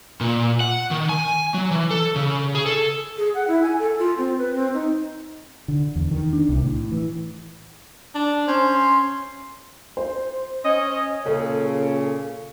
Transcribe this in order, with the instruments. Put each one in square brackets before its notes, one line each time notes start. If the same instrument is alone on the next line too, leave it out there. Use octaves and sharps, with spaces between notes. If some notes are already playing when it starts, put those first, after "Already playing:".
[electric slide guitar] A#2
F#5
D#3
G#5
F#3
E3
A4
C#3
G#4
A4
[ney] G#4
F#5
E4
G#5
A4
F4
C4
B4
C4
D#4
[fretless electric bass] D3
E2
D#3
D4
C2
A2
E3
[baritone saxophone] D4
[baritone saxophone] C#4 [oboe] C5
[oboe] C6
[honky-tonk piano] C5
[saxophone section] C#4 D#5
[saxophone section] A#2 C#3 [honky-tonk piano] A4